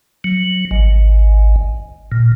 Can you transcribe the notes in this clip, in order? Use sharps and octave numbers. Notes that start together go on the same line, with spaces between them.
F#3
G#1
A#2